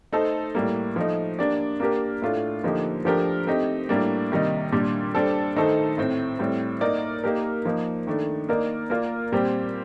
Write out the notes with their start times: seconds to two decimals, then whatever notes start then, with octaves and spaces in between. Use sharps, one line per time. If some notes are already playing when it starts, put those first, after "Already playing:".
0.12 A3 D#4 A4 C5
0.55 A2 G3 A#3
0.96 F3 A3 D#4
1.39 A#3 D4 G4 D5
1.80 A#3 D4 G4 A#4
2.22 A2 A3 D4 F4
2.64 D3 F3 A#3 D#4 G4
3.05 F3 A3 D4 G4 A#4
3.47 A3 C4 D#4 G4
3.89 A2 G3 A#3 D4
4.31 C3 D#3 G3 A#3 D#4
4.72 A#2 G3 D4 G4
5.14 G3 D4 A4 C5
5.56 D#3 A3 D#4 A4 C5
5.98 A2 A3 C4
6.39 A2 G3 C4
6.81 A#3 D#4 A#4 D5
7.24 A#3 D#4 G4 A#4
7.65 F3 A#3 D#4
8.07 D#3 A3 D4
8.49 A#3 D#4 A#4 D5
8.90 A#3 F4 A#4 D5
9.32 A#2 G3 C4 G4 C5